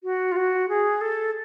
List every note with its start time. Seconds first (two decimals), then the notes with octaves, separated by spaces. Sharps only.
0.04 F#4
0.32 F4
0.36 F#4
0.69 G#4
1.01 A4